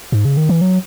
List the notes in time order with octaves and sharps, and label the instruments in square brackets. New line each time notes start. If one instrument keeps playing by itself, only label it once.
[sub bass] G#2
C#3
D#3
E3
F#3